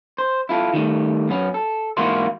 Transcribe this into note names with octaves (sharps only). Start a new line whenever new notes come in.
C5
E4 F4 A4
D#3 G3 A3
F#2 B3 C#4
A4
E2 G#2 A#3 E4 F#4 C6